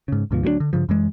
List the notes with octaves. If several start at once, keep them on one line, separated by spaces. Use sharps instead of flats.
G#2 C#3
D2 G#2 B2 F3
D2 F#3 G3 D4
D3
G2 C#3 F3
F#2 E3 G#3